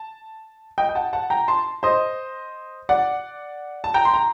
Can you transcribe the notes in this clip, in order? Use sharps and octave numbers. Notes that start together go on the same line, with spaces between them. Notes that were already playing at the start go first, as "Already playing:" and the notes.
Already playing: A5
D#5 G5
G5
F#5 A5
F#5 A5
G5 A#5
A5 C6
C5 D#5
D5 F#5
A5
G5 A#5
C6
A#5